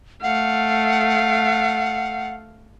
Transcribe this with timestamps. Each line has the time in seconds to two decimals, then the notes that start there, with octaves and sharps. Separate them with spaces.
0.23 A3 F5 F#5